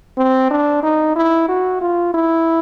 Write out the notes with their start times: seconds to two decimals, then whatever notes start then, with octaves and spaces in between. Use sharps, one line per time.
0.18 C4
0.51 D4
0.83 D#4
1.16 E4
1.48 F#4
1.81 F4
2.14 E4